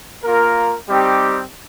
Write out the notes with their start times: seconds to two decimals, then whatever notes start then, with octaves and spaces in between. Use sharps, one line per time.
0.24 A#3 F4 A#4
0.89 G3 C4 D#4 G4